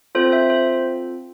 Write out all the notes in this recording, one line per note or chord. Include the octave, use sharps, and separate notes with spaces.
C4 F4 A4 C5
C5 E5
C5